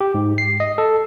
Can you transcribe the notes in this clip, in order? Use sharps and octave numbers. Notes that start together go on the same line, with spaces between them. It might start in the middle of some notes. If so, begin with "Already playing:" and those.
G4
G#2
C7
D#5
A4